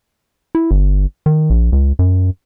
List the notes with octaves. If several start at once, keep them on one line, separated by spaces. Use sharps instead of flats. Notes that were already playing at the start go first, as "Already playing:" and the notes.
E4
G1
D#3
A#1
C#2
F#2